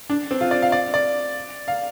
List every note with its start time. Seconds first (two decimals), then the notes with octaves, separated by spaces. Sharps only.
0.10 D4
0.31 C4
0.41 F4
0.51 D5
0.62 F5
0.72 D5
0.94 D5
1.68 F5